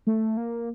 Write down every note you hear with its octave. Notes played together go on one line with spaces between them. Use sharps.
A3
A#3